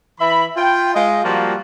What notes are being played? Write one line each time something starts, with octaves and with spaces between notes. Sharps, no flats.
E3 E5 B5
F4 G5
G#3 F4 D#5
F3 G3 A#3 F4 F#4